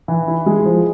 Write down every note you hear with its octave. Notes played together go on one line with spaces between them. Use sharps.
E3
E4
G#3
F3